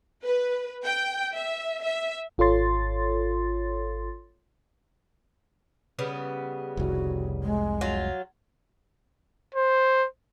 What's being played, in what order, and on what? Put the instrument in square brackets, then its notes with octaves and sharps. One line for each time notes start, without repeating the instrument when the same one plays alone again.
[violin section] B4
G5
E5
E5
[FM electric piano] G#1 F4 A4 C#5 C6 A6
[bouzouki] C#3 G3 B3
[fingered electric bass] F1 C2 [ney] F#4
[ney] G#3
[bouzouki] F#3 F4
[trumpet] C5